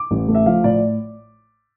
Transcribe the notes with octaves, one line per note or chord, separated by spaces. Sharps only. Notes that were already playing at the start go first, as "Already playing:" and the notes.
Already playing: D6
A1
A3
E5
F3 F5
A2 D5